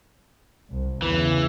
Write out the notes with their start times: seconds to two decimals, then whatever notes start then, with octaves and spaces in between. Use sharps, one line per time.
0.71 C2
1.02 E2 C#3 E3